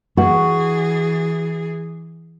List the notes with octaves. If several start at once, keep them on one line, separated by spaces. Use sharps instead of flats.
E3 F#4 G#4